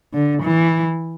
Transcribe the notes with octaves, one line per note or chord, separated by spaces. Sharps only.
D3
E3